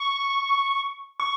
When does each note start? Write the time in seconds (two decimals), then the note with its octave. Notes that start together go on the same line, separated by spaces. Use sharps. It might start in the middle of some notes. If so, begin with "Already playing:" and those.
Already playing: C#6
1.20 C#6